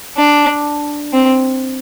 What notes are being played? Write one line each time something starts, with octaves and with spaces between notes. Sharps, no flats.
D4
C4